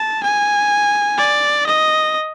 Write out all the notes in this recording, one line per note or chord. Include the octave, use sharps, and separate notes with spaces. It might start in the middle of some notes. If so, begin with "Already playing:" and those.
Already playing: A5
G#5
D5
D#5